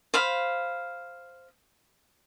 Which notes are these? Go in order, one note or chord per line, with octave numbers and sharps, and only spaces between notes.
C5 F5 B5